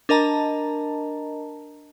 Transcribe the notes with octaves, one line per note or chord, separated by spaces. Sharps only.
D4 A#4 D#5 A5 A#5